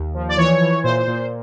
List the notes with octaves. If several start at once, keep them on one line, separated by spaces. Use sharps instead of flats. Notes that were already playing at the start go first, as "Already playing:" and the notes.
Already playing: D#2
F3
D5
E3 C#5
E3
A#2 C5
A#2